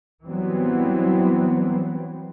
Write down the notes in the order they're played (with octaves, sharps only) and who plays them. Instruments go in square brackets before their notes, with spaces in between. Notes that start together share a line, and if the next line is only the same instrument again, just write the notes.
[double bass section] E3 F#3 G3 B3 C4